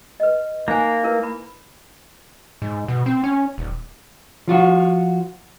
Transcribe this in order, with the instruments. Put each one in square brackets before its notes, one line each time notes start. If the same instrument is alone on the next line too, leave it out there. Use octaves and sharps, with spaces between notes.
[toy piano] B4 D#5
[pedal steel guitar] A#3 [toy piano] D#4 C5 G#5
[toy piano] E4 A#4 B4
B5
[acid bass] G#2
B2
C4
C#4
D#1
[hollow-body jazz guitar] F3 F4 F#4